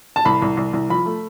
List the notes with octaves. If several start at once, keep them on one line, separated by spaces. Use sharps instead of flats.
A5
C2 B5
C2
C2
C2
F3 B5
A3